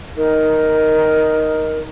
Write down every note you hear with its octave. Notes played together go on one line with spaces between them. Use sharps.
D#4 A#4